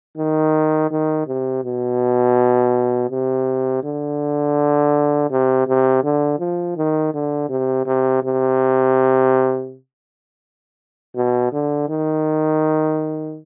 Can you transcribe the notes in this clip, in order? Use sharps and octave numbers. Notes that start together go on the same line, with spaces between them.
D#3
D#3
C3
B2
C3
D3
C3
C3
D3
F3
D#3
D3
C3
C3
C3
B2
D3
D#3